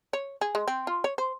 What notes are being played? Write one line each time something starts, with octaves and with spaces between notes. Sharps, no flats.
C#5
G#4
G#3
C4
F4
C#5
C5